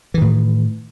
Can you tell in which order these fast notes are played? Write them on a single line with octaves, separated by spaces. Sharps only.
E3 D#3 A2